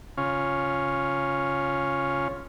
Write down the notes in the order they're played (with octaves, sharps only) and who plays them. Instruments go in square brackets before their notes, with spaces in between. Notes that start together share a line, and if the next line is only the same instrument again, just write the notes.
[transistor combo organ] C#3 C#4 F4